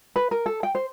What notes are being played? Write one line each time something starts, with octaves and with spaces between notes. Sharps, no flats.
B4
A#4
A4
G5
C5